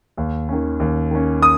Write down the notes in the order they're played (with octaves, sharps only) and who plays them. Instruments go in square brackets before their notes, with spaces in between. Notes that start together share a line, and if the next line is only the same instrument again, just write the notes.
[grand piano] D#2
D#3 C#4
D#2
D#3 C#4
D#6